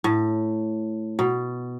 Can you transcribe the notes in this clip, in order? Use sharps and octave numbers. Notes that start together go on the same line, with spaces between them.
A2
B2